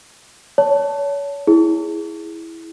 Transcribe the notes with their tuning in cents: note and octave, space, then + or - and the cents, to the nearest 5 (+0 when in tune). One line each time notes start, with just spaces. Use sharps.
C#5 +30 A5 +0
E4 +0 G#4 +0